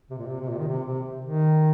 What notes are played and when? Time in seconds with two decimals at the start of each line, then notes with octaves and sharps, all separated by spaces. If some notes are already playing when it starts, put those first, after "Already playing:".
0.11 C3
0.18 A#2
0.27 C3
0.41 C3
0.49 A#2
0.59 D#3
0.68 C3
0.87 C3
1.25 D#3